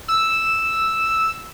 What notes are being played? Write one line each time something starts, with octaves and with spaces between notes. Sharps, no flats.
E6